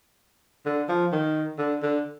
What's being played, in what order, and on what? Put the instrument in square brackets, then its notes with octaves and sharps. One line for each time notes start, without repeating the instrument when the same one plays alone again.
[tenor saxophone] D3
F3
D#3
D3
D3